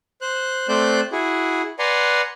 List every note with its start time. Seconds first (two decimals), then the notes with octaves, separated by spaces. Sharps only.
0.21 C5 F#6
0.69 A3 C4 C5 D5 F#6 G6
1.12 E4 F#4 G#4
1.79 B4 D5 F#5 G#5 A#5 C6